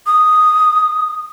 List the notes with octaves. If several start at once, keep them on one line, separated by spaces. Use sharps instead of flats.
D#6